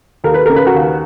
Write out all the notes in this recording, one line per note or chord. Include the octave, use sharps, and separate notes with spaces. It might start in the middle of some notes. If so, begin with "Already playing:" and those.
D#2 A#4
B4
C#3 A#4
B4
F#4 A#4
D#2